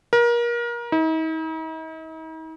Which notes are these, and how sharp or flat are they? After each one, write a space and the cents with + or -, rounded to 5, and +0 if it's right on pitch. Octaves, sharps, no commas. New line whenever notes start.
A#4 +30
D#4 +45